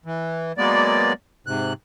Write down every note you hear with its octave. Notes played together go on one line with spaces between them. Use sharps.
E3
F#3 G#3 A#3 B3 D5
G#2 C3 F#6